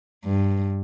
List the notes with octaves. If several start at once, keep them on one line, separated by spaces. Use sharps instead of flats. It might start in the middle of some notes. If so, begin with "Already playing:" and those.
G2